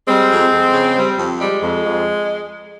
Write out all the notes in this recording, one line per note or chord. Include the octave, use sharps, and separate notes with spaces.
G3 G#3 C4
F2
F2
C#3
G3
F2
G3 G#3
F2
F2